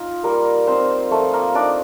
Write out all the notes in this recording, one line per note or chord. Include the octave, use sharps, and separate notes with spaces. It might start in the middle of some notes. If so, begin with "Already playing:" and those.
Already playing: D#4 F4
G3 A#3 A#4
A#3 C4 D#4 C5
F3 A3 A4
A#3 A#4
A3 D4 D#4 D5